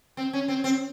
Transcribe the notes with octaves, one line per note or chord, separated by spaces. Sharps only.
C4
C#4
C4
C4